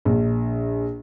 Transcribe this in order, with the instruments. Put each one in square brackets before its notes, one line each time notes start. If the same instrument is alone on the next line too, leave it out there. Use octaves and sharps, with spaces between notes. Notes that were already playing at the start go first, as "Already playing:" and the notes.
[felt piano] A#1